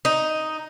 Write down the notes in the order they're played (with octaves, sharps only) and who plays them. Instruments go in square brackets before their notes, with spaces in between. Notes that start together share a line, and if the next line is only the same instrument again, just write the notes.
[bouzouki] D#4